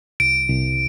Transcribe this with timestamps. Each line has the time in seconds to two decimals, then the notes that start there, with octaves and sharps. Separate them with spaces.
0.20 C2 D7
0.49 C2